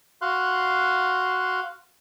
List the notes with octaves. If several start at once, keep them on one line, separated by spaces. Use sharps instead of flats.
F#4 F5 C6 F#6